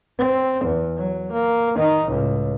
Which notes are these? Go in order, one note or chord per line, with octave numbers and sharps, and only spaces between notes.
C4
E2
F#3
A#3
D#3 D#4
C#2 A2